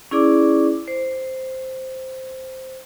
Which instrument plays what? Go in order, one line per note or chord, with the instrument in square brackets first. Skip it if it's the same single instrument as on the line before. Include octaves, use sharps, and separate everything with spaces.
[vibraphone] C#4 E4 G#4 D5 D6
C5